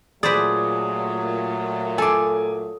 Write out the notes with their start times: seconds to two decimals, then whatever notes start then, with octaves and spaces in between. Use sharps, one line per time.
0.23 A#2 F#3 A3 G#4 B4 C5 D5 D#6
1.98 A4 G#5 C6 D6